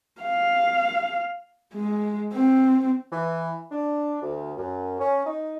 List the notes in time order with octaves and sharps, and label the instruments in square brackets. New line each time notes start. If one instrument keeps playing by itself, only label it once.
[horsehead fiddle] F5
G#3
C4
[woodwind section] E3
D4
D2
F#2
C#4
D#4